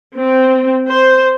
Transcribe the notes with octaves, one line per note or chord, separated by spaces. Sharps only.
C4
C5